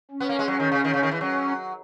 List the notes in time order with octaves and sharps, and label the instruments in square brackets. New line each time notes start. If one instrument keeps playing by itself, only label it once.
[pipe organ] C#4
[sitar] B3
A#3
G#3
F#3
D#3
C#3
D#3
C#3
D#3
E3
[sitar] F#3 [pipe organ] C#4